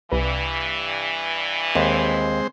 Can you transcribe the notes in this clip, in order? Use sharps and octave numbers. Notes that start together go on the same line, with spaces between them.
C2 G2 E3 B4
D#2 G#3 C4 C5